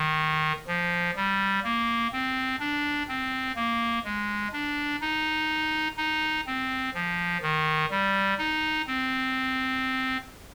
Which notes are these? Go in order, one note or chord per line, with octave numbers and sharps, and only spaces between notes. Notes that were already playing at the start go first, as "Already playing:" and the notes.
Already playing: D#3
F3
G3
A#3
C4
D4
C4
A#3
G#3
D4
D#4
D#4
C4
F3
D#3
G3
D#4
C4